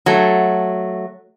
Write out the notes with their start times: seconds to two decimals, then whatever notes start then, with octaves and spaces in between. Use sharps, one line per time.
0.06 F#3 A3